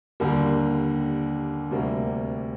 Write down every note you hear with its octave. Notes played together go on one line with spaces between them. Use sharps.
D#2 D3 G3 A#3
D2 C3 G3 A#3